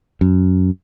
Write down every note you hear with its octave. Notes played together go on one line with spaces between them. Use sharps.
F#2